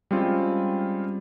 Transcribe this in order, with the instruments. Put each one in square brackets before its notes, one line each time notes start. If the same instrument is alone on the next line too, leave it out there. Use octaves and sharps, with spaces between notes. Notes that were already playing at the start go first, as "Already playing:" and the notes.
[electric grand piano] G3 G#3 C4 C#4 F4